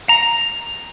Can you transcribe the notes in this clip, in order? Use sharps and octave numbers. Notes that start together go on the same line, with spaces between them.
A#5